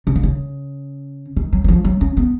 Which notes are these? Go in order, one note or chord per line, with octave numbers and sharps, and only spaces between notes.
C#3
D#3
C#3
D#3
F#3
F#3
F3
F#3
C#4
B3